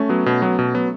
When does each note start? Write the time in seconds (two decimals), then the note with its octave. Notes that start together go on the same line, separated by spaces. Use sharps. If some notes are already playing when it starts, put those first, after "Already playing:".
Already playing: A3 C#4
0.09 F#3 B3
0.26 B2
0.42 F#3 B3
0.59 B2
0.74 F#3 B3